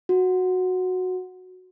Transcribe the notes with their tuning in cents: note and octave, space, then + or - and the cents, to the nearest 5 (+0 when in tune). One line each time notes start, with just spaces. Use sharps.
F#4 -10